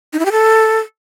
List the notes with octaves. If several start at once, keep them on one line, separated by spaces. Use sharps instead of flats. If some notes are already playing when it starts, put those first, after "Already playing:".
D#4
E4
G4
A4